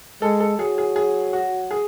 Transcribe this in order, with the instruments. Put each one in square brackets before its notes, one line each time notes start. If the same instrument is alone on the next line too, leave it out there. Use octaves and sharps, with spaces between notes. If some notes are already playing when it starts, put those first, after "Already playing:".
[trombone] G#3 [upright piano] A4
[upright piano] A4
[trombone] F#3 [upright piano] G#4
[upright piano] G#4
G#4
F#4
G#4